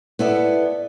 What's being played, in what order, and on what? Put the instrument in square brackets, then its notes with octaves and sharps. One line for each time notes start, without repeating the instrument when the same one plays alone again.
[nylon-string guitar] B3 E4 A4 D5